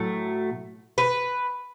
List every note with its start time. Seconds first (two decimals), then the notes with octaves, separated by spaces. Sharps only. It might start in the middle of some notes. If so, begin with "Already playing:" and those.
Already playing: A2 F#3 A3
0.98 B4